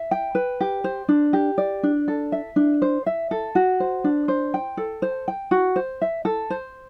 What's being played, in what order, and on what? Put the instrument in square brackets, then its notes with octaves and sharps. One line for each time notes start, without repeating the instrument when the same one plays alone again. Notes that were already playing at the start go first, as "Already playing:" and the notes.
Already playing: [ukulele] E5
G5
B4
G4
C5
D4
G4
D5
D4
A4
E5
D4
C5
E5
A4
F#4
C5
D4
C5
G5
A4
C5
G5
F#4
C5
E5
A4
C5